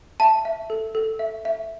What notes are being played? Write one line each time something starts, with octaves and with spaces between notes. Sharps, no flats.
E5 A5
E5
A4
A4
E5
E5